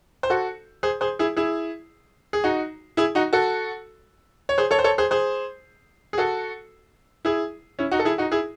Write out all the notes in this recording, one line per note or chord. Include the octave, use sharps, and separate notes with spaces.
C5
F#4 A4
G#4 C5
G#4 C5
E4 G#4
E4 G#4
G#4
D#4 F#4
E4 G#4
D#4 F#4
F#4 A4
C#5
G#4 C5
A4 C#5
C5
A4 C#5
G#4 C5
G#4 C5
G#4
F#4 A4
E4 G#4
C#4 E4
D#4 F#4
A4
E4 G#4
D#4 F#4
E4 G#4